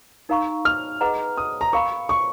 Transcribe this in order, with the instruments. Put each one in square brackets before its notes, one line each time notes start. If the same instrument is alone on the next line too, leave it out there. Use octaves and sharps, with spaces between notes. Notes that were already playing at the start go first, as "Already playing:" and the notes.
[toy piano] D#4 A#4 F5 A#5 C#6
[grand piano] F6
[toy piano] G#4 B4 D#5 F#5 A#5
[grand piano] D#6
A#5
[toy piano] A#4 F5 B5 [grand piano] C#6
[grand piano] C#6